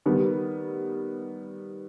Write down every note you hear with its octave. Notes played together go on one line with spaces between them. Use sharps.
D#3 G3 B3